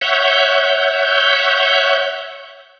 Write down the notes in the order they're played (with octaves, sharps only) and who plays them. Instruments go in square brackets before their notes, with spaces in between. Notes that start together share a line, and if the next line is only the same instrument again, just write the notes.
[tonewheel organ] C#5 E5 F#5 G6